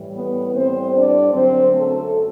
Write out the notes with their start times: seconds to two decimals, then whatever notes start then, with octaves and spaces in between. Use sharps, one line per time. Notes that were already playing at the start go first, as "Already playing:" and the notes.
Already playing: A2 E3 G3
0.15 B3 B4
0.55 A2 G3 C4 C5
0.94 D4 D5
1.32 F#2 D3 F#3 C4 C5
1.72 A3 A4